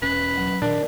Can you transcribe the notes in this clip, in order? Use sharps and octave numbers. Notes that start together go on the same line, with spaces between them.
E1 C#4 B4
F#3
A#2 D#3 D4 A#4 D5